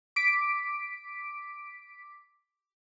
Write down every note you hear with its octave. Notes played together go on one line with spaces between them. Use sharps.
D6 B6 D7